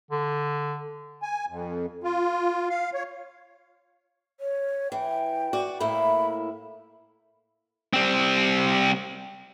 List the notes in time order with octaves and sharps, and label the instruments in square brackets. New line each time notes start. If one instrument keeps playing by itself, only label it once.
[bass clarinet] D3
[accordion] G#5
F2
F4
F5
C#5
[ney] C#5
[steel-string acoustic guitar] E3 [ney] G5
[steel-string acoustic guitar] F#4 D5
[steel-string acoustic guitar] A2 A#3 E4 [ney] B5
[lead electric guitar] G3 C4